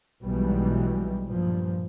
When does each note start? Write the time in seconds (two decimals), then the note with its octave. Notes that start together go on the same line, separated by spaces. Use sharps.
0.23 B1 B2 E3 G3 G#3
1.27 G2 A#2 F3